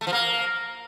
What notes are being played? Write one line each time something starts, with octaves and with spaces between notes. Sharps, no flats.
A3
F3
A#3